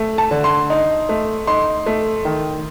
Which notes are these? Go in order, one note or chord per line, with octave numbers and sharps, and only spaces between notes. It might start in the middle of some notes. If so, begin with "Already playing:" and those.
Already playing: A3
A5
D3
C6
D#4
A3
D#4 C6
A3
D#3